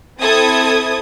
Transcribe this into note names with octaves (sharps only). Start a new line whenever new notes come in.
C4 E4 A4 D#6 G#6